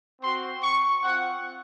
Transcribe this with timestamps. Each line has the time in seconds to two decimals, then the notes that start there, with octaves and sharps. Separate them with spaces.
0.22 C4 F#4 C6
0.62 C#6
1.02 C4 F4 F#5